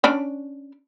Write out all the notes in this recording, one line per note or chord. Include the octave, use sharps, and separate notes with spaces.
C#4 D4